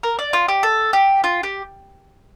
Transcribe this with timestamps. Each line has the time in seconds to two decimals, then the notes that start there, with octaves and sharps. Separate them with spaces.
0.03 A#4
0.19 D5
0.33 F4
0.48 G4
0.63 A4
0.93 G4
1.24 F4
1.43 G4